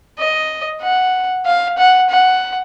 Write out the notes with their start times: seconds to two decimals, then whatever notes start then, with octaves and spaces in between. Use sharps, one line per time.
0.19 D#5
0.82 F#5
1.46 F5
1.78 F#5
2.10 F#5